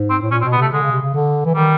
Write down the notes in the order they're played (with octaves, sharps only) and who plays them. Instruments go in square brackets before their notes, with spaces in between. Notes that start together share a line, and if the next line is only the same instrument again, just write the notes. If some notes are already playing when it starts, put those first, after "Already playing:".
Already playing: [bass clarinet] G#2
[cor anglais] C4
[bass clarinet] A2
[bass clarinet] A#2 [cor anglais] C#4
[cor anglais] C4
[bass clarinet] B2
[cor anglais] B3
[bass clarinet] C3 [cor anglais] A3
[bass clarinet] D3 [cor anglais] G#3
[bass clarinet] C#3
C3
C#3
D3
E3
[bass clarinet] D#3 [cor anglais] G3